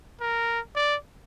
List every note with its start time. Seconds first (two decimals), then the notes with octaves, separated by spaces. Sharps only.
0.21 A#4
0.76 D5